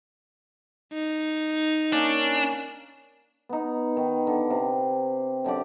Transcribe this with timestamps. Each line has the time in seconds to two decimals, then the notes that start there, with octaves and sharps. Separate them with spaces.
0.93 D#4
1.93 A#3 C#4 D4
3.49 B3 D#4
3.97 D#3
4.27 D3
4.50 C3
5.44 F#2 D3 G4 D5